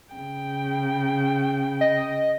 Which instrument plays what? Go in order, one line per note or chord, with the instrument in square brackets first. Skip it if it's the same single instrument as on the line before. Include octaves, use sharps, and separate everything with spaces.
[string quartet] C#3 G5
[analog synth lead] D#5